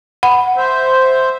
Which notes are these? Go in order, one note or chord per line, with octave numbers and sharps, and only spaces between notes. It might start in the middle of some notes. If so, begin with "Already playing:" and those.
F#5 B5
C5 E5